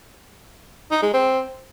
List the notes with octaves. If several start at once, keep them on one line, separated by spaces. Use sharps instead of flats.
D#4
G#3
C4